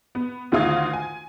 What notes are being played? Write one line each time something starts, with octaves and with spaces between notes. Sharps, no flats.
B3
D2 D#3 F4 F5 D#6 G#6
G#5